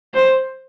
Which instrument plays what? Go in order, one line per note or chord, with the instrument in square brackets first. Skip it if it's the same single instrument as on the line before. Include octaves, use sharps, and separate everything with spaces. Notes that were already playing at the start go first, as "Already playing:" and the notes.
[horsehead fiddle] C5